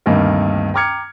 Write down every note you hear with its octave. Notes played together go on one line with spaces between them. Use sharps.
D2 G2 C3 D#3 G3 A#3
G5 A#5 D6 F6 G#6 C#7